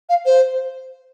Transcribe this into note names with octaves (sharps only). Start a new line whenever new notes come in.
F5
C5